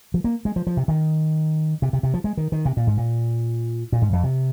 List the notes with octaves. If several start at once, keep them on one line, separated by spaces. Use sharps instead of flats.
F3
A#3
G#3
F3
F3
C3
D#3
C3
C3
C3
F3
G#3
D#3
D#3
C3
A#2
G#2
A#2
A#2
G#2
F2
C3